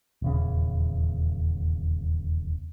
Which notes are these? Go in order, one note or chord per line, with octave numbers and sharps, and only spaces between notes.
D#1 E2 C#3